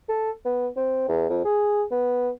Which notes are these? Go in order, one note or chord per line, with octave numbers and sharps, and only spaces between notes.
A4
B3
C4
E2
F2
G#4
B3